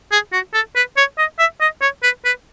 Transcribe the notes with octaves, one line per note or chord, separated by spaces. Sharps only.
G#4
F#4
A4
B4
C#5
D#5
E5
D#5
C#5
B4
B4